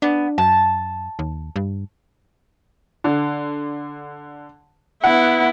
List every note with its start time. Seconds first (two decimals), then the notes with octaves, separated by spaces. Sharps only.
0.02 B3 D4
0.38 F#2 A5
1.19 D#2
1.56 G2
3.04 D3
5.04 B3 E4 F#5